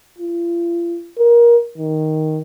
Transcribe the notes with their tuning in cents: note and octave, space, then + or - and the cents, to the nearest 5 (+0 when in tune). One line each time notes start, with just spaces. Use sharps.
F4 -40
A#4 +20
D#3 +5